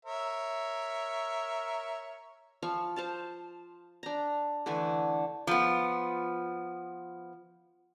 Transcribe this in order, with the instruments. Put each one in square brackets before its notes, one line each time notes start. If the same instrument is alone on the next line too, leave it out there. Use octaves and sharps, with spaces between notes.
[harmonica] A#4 C#5 E5
[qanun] F3 F5 C#6
C5 F5 A5
D4 A#5
D3 E3 A3 G#5
[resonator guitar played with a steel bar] F3 B3